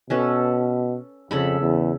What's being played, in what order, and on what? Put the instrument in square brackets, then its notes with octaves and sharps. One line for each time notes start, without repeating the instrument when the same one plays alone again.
[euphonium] B2 [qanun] C#4 A4 B4
[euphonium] F2 [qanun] C#3 A4 B5
[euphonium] E2